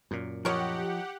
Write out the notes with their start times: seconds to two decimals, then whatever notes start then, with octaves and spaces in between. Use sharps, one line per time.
0.11 F#2 A#2
0.45 F3 G4 A#4 C#5 D#5 F#5